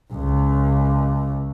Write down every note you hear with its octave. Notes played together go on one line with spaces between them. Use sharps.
C#2